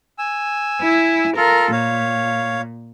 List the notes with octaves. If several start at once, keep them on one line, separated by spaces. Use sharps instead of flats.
G#5 E6
E4
F4 A4 A#4
A#2 C#5 F5